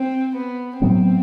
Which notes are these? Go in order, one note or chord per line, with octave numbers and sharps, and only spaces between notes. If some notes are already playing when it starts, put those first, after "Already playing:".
Already playing: C4
B3
A2 F#3 B3 C4